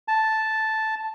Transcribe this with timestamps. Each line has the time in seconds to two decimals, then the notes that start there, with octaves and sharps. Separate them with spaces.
0.08 A5